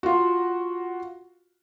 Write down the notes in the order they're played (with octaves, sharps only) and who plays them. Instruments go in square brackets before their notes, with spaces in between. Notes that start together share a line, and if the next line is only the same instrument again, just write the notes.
[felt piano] F4 F#4